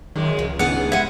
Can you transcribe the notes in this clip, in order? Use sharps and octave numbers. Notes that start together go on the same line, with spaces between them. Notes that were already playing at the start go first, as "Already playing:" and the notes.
F#2 D#3 G#3
C#2 F3
D#2 B3 D4 G#4 F#5
G3 G#3 E4 F#5